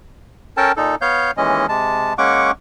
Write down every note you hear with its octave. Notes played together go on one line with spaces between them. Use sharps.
C#4 A4 A#4 G5 A5
A#2 D#4 A4
B3 C#5 F5 G6
D#2 E3 G#3 C#4 D#5
C3 G#3 A5
G#3 A#3 C#4 F#5 C#6 D6